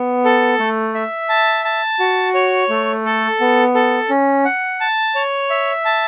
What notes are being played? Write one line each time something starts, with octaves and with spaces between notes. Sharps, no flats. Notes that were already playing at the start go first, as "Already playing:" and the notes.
Already playing: B3
A4
A3
E5
A5
A5
F#4
C#5
A3
A4
B3
A4
C#4
F#5
A5
C#5
E5
A5